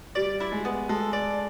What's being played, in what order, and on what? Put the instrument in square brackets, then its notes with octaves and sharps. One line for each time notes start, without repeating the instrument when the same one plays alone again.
[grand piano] G3 [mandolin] D5
[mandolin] E4
[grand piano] G#3
[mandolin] B3
[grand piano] G#3 [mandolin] A4
[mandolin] D5